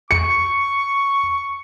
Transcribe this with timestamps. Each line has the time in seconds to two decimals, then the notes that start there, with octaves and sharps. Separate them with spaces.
0.11 C#6 C#7